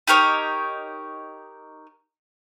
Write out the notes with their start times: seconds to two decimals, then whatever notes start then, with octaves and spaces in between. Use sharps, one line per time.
0.07 D#4 G4 A#4 C#5